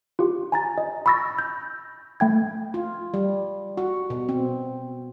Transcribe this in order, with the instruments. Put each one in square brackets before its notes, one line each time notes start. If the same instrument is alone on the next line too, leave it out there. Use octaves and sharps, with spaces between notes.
[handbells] F4 G4
G#5 A#5 A6
D#5
B5 C#6 E6 A6 A#6
G6
A3 G5 G#6
[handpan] F4
G3
F#4
B2
C4